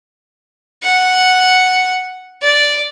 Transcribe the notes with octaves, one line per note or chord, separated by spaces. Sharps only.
F#5
D5